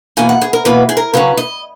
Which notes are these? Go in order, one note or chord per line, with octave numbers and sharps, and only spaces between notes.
E2 B2 A#3 G#5
F#5
G#4
A#4
E2 B2 A#3 B4
G#4
A#4
C#3 F#3 C#4 B4
D#5